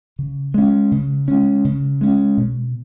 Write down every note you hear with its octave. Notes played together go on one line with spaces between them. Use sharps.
C#3
G#3 C#4
C#3
G#3 C#4
C#3
G#3 C#4
B2